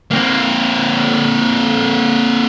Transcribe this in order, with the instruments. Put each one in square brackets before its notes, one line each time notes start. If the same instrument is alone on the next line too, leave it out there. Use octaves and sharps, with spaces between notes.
[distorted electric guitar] A#3 C4